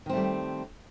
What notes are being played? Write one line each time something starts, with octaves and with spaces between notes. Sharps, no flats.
D#3 G3 A3 C4